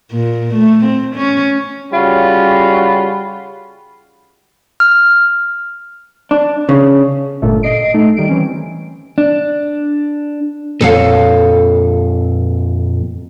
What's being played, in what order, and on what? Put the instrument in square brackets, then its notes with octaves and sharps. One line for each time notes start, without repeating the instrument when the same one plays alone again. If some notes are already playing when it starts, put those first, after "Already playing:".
[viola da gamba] A#2
A3
C4
C#4
[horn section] C#3 G3 C#4 F4 F#4 B5
[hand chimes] F6
[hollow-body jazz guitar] D4
C#3
[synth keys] G1 A#2 A3
D#5 C7 D7
A3 D#4
D#3 G3 D7
E3 C4 C#4
[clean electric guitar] D4
[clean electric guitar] F2 A#2 [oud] A4 C#5 F5